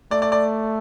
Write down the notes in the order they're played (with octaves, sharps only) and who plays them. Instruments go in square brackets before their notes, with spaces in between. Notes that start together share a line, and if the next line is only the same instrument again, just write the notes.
[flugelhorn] A3 [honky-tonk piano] D5
[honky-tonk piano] D5
D5